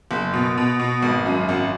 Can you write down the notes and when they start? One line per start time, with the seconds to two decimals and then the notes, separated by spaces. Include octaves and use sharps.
0.11 F#1
0.33 B2
0.57 B2
0.79 B2
1.02 G#1
1.26 F#2
1.49 G#1